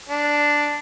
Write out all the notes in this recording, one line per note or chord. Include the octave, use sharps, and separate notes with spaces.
D4